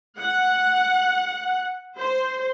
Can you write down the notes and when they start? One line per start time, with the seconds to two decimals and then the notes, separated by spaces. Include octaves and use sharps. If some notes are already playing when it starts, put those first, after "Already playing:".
0.18 F#5
1.98 C5